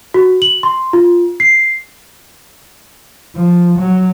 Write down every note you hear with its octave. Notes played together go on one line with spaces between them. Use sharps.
F#4
F#7
C6
F4
C7
F3
F#3